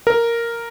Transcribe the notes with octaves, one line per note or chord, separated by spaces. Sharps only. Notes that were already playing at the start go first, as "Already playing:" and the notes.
A#4